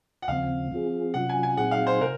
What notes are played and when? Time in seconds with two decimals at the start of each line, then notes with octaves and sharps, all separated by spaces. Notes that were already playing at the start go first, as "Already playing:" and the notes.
0.22 F#5
0.28 D#2 C#3 F3 C4 F5
0.71 F3 C4 F4 G#4
1.14 C3 F#3 C#4 F4 F#5
1.29 G#5
1.43 G#5
1.57 A#2 F#3 C4 D#4 G#4 F#5
1.71 F5
1.87 C5
2.01 C3 A#4